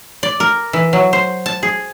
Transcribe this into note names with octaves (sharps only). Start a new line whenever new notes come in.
D5
A#4
E3
F#3
C5
A5
G#4